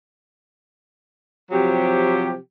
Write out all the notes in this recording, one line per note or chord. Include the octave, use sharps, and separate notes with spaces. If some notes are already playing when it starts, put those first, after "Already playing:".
C3 F3 F#3 G4